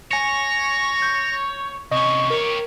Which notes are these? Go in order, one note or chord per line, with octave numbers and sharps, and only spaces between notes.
C#5 G#5 A#6 C#7
G6
C3 C#4 D#5 C#6
G4 A#4 C#5